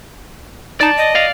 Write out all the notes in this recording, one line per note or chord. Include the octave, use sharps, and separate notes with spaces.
D#4 D5 A5
D#5
D5 F5